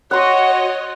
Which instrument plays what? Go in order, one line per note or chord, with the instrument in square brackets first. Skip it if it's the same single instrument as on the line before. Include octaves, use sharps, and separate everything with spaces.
[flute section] F#4 [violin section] C#5 D#5 [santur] F#5 C6